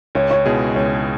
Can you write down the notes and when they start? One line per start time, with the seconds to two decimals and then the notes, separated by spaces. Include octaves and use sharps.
0.15 C#2 C#5
0.30 C#5
0.46 B2 G#3 E4 G#4
0.75 C#2 C#5